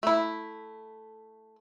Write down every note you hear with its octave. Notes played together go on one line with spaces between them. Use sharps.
A3 E4